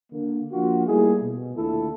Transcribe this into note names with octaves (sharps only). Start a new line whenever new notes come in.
D3 A#3
F3 A#3 D4 F4 F#4
G3 A3 A#3 D#4 E4 G#4
B2
D#2 D3 A3 E4 F4 A4